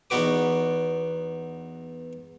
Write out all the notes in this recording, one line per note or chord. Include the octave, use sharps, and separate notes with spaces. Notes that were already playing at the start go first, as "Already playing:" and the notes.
E2 B3 D#4 F#4 B4 D6